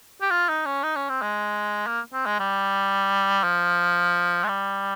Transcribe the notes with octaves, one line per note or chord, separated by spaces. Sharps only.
G4
F4
D#4
C#4
D#4
C#4
C4
G#3
A#3
C4
G#3
G3
F3
G#3
G3